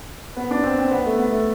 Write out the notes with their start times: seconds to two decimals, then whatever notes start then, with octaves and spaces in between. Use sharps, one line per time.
0.36 B3
0.51 D4
0.64 C4
0.78 C4
0.91 B3
1.06 A3
1.18 B3
1.32 A3